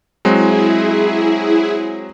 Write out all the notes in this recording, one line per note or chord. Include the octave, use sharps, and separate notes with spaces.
F#3 G#3 C4 E4 G#4